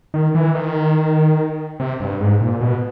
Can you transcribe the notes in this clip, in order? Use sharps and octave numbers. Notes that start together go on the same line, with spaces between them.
D#3
E3
D#3
C3
G2
G#2
A#2
B2